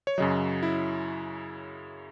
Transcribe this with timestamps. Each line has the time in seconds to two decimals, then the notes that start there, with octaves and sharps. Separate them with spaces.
0.07 C#5
0.18 F#2 C#3 F#3 D#5
0.63 E4